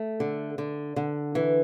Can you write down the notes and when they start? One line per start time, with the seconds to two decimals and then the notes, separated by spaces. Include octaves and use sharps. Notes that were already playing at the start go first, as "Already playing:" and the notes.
Already playing: A3
0.20 D3
0.58 D3
0.96 D3
1.35 E3